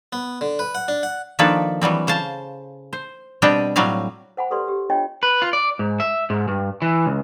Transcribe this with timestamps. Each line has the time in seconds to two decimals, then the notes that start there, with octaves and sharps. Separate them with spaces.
0.13 B3
0.41 D3
0.59 B4
0.75 F#5
0.88 D4
1.03 F#5
1.39 D#3 F3 A#3 D4 A4 B4
1.82 E3 F#3 G3 C4
2.07 C#3 C5 F5 A5
2.93 C5
3.42 B2 G3 C4 D4 D#5 G5
3.76 A2 F#3 G3 C4 F5
4.37 C5 F#5 G#5 B5
4.50 G4 A4 B4 D5 C6
4.68 G4
4.90 D4 F4 C#5 D#5 G5
5.23 B4
5.42 F4
5.53 D5
5.79 G#2
6.00 E5
6.30 G#2
6.48 G2
6.82 E3
7.06 C#2